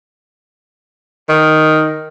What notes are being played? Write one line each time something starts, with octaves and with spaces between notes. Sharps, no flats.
D#3